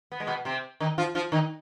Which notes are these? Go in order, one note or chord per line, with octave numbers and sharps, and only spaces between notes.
B3
G#3
B2 B3
C3 C4
D#3 D#4
F3 F4
F3 F4
D#3 D#4